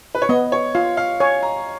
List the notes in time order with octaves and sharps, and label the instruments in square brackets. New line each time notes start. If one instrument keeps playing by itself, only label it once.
[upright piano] B4
C#5
[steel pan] B3 [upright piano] D#5
[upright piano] C#5
[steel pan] F4 [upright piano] F5
[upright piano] F5
[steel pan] C#5 [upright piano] G#5
[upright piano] A#5